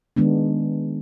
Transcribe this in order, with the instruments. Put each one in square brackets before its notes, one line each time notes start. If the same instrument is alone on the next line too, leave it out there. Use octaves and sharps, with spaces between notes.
[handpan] D#3 G#3 B3 D4